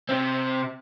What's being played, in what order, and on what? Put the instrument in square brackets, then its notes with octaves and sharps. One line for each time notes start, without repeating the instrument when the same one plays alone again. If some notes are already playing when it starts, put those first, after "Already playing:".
[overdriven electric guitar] C3 C4